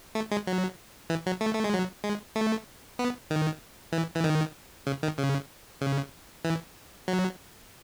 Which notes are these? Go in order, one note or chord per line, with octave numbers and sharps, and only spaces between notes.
A3
G#3
F#3
E3
F#3
A3
A3
G#3
F#3
G#3
A3
B3
D#3
E3
E3
D#3
C#3
D#3
C#3
C#3
E3
F#3